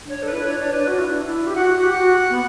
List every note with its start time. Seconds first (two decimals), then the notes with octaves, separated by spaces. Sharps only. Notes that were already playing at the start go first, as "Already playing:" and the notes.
0.05 D4 C#5
0.19 D4 A4
0.28 E4 B4
0.41 E4
0.46 D4 C#5
0.59 D4 C#5
0.73 D4 B4
0.87 F#4
0.98 E4
1.10 D4
1.22 E4
1.46 G4
1.55 F#4 F#5
1.70 F#4
1.83 G4
1.97 F#4
2.29 B3